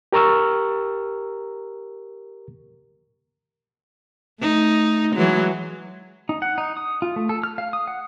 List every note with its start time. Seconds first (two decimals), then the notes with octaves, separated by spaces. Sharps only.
0.13 G4 A#4 A#5 C#6 E6 F6
4.41 A3 D#4
5.14 E3 F#3 G#3
6.29 D#4
6.42 F#5
6.58 D#4
6.77 D#6
7.02 F4
7.16 A3
7.29 A4
7.43 F6
7.58 F5
7.73 D#6
7.87 F#5